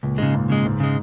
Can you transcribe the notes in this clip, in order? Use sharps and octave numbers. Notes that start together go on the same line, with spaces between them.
C#2 A#2
G#2 C#3 G#3
C#2 A#2
C#3 G#3
C#2 G#2
C#3 G#3